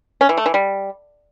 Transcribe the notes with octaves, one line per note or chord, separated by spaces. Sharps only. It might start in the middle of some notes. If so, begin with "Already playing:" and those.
C#4
E3
A3
E3
G3